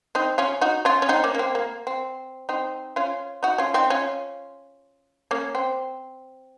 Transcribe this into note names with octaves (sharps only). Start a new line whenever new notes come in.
C4 D#4
C#4 F4
D#4 F#4
C#4 F4
C#4
C4 D#4
A#3 C#4
A#3
C4
A#3
C4
C4 D#4
C#4 F4
D#4 F#4
C#4 F4
C4 D#4
C#4 F4
A#3 C#4
C4